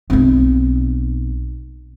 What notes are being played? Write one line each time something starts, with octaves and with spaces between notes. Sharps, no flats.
B1 C4